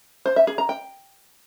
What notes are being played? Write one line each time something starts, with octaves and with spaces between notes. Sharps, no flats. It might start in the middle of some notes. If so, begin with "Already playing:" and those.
C5
E5
G#4
A#5
G5